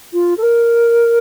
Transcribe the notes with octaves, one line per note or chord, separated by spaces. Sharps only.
F4
A4
A#4